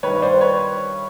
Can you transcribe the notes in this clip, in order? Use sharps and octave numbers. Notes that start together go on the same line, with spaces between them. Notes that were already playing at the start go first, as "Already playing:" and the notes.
G2 D#3 B4 C#5
C5 D5
B4 C#5